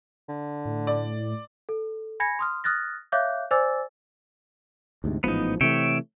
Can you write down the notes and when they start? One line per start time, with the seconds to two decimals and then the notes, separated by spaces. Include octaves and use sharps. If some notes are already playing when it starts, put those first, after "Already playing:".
0.29 D3
0.65 A2
0.87 D5
1.69 A4
2.20 G#5 B5 G#6 A#6 C#7
2.39 C6 D#6 F6
2.64 D#6 F6 F#6 A6 A#6
3.12 C#5 E5 F5 D6 F#6 G6
3.51 C5 D5 G#5 D6 E6 A6
5.04 D2 G#2 C3
5.24 A1 G#2 F3 B3 D#4
5.61 C3 E3 A3 C#5 E5 G5